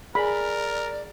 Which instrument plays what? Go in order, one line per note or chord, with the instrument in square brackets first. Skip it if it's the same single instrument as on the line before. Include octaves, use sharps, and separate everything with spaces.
[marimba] G#4 G#5 [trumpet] A#4 [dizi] D5 [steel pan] B5